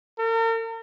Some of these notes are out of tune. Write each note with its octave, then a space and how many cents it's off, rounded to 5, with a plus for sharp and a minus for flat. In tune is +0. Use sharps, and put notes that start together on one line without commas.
A#4 -40